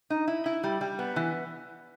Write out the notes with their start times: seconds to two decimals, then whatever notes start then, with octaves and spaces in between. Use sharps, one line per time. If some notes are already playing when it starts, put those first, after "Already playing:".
0.10 D#4
0.28 E4
0.46 E4
0.64 G3
0.81 G3
0.99 B3
1.16 E3